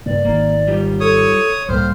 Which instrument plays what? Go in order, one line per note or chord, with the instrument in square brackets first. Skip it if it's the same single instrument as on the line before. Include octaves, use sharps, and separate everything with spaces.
[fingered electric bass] G2 C#3 A#3 [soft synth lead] D5
[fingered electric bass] G#1 D#3 [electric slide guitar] A#3
[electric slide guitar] G3 F4 G4
[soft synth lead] A4 [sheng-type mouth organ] C#5 D#6
[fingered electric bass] C#2 A2 A#3 [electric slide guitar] G3 [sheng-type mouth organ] C5 [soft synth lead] F6